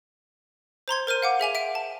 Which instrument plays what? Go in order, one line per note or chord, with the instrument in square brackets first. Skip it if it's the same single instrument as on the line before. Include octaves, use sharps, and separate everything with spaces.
[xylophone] C5 A#5 C6 G#6
A#4 C5 F6 D#7
F5 F#5 D6
G#4 E5 G#5 F7
E5 D7
A5